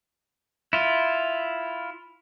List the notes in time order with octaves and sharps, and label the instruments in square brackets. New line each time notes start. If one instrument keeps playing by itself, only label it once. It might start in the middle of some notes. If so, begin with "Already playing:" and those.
[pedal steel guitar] E4 F4